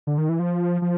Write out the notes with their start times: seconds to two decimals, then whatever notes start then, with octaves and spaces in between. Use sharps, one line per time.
0.07 D3
0.18 D#3
0.29 E3
0.39 F3
0.82 F3